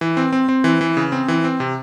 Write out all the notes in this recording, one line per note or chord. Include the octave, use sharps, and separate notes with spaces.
E3
C4
C4
C4
E3
E3
C#3
C4
E3
C4
C3